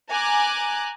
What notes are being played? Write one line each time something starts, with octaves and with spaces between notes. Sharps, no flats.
G#5 A#5 D6 F#6